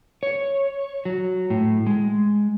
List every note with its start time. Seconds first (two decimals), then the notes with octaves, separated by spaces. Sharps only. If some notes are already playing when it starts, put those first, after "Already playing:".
0.23 C#5
1.05 F#3
1.50 A2
1.87 G#3